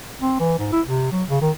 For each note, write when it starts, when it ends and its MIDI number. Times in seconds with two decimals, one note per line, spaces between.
0.22 0.38 60
0.40 0.58 52
0.59 0.70 44
0.72 0.81 64
0.87 1.09 48
1.12 1.24 54
1.29 1.41 49
1.41 1.51 51